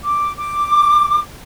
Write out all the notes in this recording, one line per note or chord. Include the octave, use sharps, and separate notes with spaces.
D6
D6